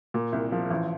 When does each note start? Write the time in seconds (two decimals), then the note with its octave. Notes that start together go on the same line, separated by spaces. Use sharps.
0.14 A#2
0.33 C2
0.52 F3
0.70 A1